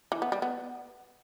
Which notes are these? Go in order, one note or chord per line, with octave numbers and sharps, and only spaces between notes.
E3
B3
G3
B3